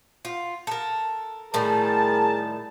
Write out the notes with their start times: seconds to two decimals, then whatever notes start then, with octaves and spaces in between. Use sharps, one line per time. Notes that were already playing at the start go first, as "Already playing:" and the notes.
0.25 F4
0.67 A4 A#4
1.54 A2 D#3 G3 G#4 A#4 A5